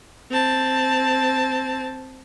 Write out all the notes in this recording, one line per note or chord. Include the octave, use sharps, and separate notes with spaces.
C4 A5